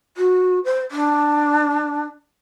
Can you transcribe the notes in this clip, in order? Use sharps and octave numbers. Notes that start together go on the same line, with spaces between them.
F#4
C5
D4